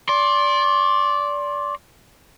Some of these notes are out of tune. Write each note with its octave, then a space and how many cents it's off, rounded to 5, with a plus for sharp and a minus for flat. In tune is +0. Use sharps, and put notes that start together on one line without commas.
D5 -20 C6 +25